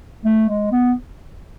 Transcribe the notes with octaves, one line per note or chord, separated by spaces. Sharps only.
A3
G#3
B3